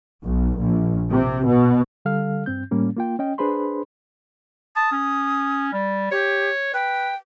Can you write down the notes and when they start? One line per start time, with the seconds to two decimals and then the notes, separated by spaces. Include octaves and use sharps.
0.24 B1
0.58 A#1
1.10 C3
1.47 B2
2.05 D3 G3 A4 F5 F6
2.46 G2 C4 G6
2.71 A2 G3 A#3 C#4
2.96 A#3 F4 G5
3.19 C#4 D#5 G5
3.38 D4 G#4 B4 C5 B5 C6
4.76 A5 D#6
4.92 C#4
5.73 G3
6.11 G4 C#5
6.74 B4 G5